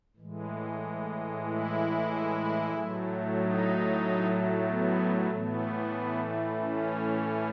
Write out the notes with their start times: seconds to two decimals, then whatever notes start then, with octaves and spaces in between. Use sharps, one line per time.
0.17 A2 E3 G#3
1.45 E4
2.74 A2 F#3 A3
3.38 D#4
4.67 B3
5.31 A2 E3 A3 B3
6.59 C#4